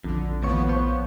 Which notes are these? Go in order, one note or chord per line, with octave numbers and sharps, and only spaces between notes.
A#1 F2 D3
D#2 A2 F3 B3 C#5
C5 C#5